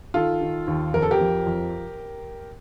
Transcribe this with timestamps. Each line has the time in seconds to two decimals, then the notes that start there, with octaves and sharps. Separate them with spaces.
0.14 D#3 F4 A4
0.41 D#3
0.68 D#2
0.94 F2 A#4
1.02 A4
1.11 G4 A#4
1.20 F3
1.46 F2